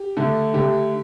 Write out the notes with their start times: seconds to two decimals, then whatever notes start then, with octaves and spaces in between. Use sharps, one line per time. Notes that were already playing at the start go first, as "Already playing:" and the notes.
Already playing: G4
0.17 D3 A3
0.54 D3 A3 G4